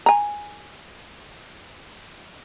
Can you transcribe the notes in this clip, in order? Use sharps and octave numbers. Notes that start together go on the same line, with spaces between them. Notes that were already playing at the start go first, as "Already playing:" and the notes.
G#5 A#5